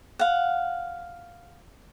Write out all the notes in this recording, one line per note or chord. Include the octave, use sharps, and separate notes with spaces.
F5 F#5